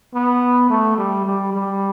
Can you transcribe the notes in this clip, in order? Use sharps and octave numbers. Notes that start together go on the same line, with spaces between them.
B3
A3
G3
G3
G3